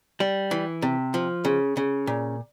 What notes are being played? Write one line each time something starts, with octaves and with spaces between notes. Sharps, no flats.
G3
E3
C3
F3
C#3
C#3
A#2